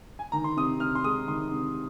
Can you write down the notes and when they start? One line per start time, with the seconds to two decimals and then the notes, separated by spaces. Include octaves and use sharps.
0.19 G#5
0.32 D#3 A#5
0.44 C6
0.57 C3 D#6
0.80 C3 F6
0.95 C6
1.04 G#3 D#6
1.27 D#3 C6
1.51 C3